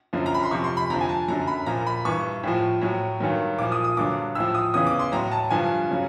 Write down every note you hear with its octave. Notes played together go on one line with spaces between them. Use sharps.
F#2 D3 F3
A#5
B5
C6
F2 C3 F3 C#6
C6
B5
F2 D3 F3 A#5
G#5
A5
F#2 D3 F#3 A#5
B5
A#2 F3 A#5
B5
G2 E3 C#6
A2 F3
A2 F#3
G2 D#3 F#3
A#2 F3 D6
D#6
D#6
G2 D3 F#3 D6
A2 F3 E6
D#6
E2 C#3 E3 D#6
D6
C6
A2 F#3 A#5
A5
G2 D3 F3 G#5
C#3 F#3